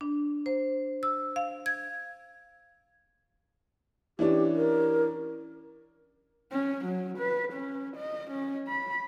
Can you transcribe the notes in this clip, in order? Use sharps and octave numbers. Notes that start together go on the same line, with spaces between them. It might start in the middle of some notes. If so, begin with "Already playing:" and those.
D4
C5
E6
F5
G#6
E3 C#4 D4 G4
A#4
C#4
F#3
B4
C#4
D#5
C#4
B5